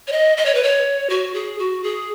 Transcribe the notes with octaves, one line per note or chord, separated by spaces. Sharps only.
C#5
D#5
D#5
C#5
B4
C#5
F#4
G#4
F#4
G#4